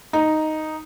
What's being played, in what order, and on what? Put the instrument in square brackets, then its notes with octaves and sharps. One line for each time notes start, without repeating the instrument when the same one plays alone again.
[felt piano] D#4